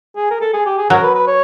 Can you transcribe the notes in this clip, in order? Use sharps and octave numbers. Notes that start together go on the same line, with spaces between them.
G#4
A#4
A4
G#4
G4
G#4
F#3 A#4
B4
B4
C#5